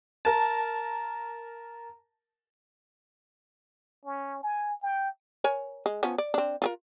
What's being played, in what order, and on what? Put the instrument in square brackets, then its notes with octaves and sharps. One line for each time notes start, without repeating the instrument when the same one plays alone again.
[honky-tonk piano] A#4 A5
[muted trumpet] C#4
G#5
G5
[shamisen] A#4 C#5 G#5
G#3
F3 B3 C#4
D5
C4 D4
F4 G#4 A#4